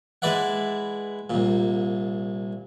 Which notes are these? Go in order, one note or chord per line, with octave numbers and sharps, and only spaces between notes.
G#3 E4 B4 D5 E5 F#5
C2 A#2